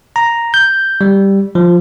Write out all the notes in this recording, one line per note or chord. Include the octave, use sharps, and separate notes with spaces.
A#5
G6
G3
F3